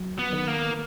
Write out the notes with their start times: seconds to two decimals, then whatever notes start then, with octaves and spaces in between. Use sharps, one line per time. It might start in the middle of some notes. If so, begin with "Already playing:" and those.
Already playing: F#3
0.19 B3
0.33 D#3
0.47 A#3